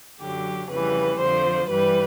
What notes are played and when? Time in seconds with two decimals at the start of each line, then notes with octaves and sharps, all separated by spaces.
0.20 F#2 D3 F#3 G4
0.70 F2 C#3 E3 G3 B4
1.20 F2 D3 F3 C5
1.69 G2 E3 G3 B4